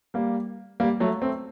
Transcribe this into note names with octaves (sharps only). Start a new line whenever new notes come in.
G3 A#3
G3 A#3
F#3 A3
A3 C4